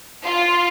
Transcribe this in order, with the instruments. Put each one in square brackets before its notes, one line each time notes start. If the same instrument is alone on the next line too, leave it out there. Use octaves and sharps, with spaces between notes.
[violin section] F4